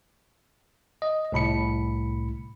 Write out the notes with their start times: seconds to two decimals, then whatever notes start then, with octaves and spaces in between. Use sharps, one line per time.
1.02 D#5
1.32 C2 A2 B5 C#7